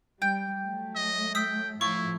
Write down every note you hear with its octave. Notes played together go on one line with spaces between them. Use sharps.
G3 G5
F#3 A3
D#5
G5 D#6 E6 B6
A2 F3 E4 F4 C#6